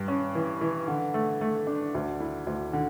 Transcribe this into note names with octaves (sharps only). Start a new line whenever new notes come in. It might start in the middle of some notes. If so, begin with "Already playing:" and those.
Already playing: G2
C#4
E3
E3
D3
A3
A3
D4
D2
E4
D2
D3